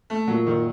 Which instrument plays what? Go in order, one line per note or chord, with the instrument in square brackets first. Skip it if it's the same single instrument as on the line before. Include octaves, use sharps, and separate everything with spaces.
[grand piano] A3
[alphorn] A#2 [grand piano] F#3
[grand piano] D#3